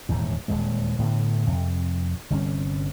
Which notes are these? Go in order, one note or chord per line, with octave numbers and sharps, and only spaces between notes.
D#1 E2 G#2
D#1 E2 A#2 G#3
A2 D3 B3
F2 C3
G1 C3 G3 C#4